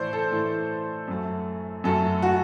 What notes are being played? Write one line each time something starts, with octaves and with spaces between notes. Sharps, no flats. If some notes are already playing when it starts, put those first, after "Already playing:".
Already playing: A2 E3 A3 A4 C5 D5
A4
A2 E3 A3
F#2 F#3 A3
F#2 F#3 A3 A4
F#4